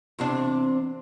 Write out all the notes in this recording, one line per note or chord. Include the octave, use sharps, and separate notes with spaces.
E2 C3 D4